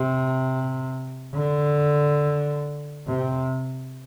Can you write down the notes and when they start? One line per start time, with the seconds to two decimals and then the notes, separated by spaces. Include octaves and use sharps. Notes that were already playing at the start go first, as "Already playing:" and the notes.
Already playing: C3
1.34 D3
3.07 C3